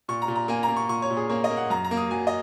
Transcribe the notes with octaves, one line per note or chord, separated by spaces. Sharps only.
A#2 C#6
A#5
A#2
A#5
A#3 G#5
A#5
A#3
C#6
A#2 C#6
C#5
A#2
G#4
A#3 C#5
D#5
A#3
F#5
F#2 A#5
A#5
A#3
D#6
F#3 G#5
D#5